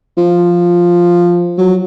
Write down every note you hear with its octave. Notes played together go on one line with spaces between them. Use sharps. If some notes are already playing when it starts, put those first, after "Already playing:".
F3
F#3